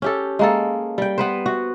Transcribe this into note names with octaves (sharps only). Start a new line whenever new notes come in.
C#4 G4 A4
G#3 A#3 A4
G3 G5
B3 B4 C5
F#4